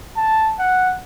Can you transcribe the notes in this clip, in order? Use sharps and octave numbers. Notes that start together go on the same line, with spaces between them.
A5
F#5